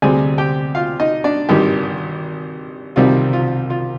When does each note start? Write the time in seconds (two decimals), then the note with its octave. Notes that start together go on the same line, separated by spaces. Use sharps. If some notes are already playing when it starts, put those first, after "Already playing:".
0.02 D2 C3 G3 C4 G#4 G#5
0.38 G4 G5
0.75 F4 F5
1.00 D#4 D#5
1.24 D4 D5
1.49 G#1 G2 D#3 G3 G4
2.96 C2 C3 D#3 G3 C4 F4
3.33 F4
3.70 F4